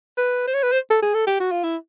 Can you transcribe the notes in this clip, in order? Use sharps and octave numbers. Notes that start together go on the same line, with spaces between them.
B4
C5
C#5
B4
C5
A4
G#4
A4
G4
F#4
F4
E4